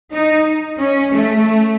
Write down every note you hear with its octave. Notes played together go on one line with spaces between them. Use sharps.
D#4
C#4
A3